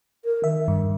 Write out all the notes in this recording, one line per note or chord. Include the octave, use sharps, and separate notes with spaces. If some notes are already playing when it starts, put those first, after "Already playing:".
A#4
D#3 E5
G2